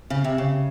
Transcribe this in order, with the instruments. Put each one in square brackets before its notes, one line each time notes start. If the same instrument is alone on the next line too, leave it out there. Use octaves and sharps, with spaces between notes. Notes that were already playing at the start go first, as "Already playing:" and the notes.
[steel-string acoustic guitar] C#3
C3
C#3